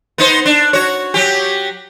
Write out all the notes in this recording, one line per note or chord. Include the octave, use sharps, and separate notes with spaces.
B3 D#4 C5
D4
F#4 C#5
F#3 G4